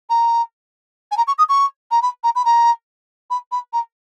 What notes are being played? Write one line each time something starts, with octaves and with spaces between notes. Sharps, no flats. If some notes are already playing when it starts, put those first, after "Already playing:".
A#5
G#5
A#5
C#6
D#6
C#6
A#5
B5
A#5
B5
A#5
B5
B5
A#5